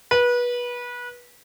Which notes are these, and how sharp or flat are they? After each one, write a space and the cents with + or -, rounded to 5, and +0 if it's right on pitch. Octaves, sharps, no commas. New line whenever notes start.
B4 -25